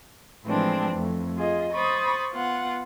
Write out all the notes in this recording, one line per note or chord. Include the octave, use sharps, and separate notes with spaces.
A2 E3 F3 G#3 C4 D4
F2 A3
F4 G#4 D#5
C5 B5 C#6 D#6 A6
B3 F4 F#5